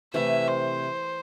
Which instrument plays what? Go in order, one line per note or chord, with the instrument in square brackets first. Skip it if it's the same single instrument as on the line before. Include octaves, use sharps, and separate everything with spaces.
[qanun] C3 E3 A3 E4 [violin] E5
[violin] C5